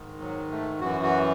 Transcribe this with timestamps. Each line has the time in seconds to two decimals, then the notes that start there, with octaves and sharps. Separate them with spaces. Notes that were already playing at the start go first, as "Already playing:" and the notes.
Already playing: G#2 D#3
0.20 F#3
0.51 A3
0.80 F#2 E3 F#4
1.03 F#4